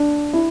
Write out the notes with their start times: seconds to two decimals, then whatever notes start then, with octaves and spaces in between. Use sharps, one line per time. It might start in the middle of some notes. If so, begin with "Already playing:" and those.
Already playing: D4
0.33 E4